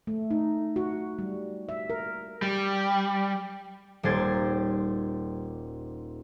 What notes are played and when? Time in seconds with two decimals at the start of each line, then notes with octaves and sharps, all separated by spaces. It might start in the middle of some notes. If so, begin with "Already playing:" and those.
0.07 A3
0.31 D#4
0.76 F#4
1.19 G3
1.69 E5
1.90 A#4
2.42 G3
4.03 D#1 G3 G4 C5 G#6 A6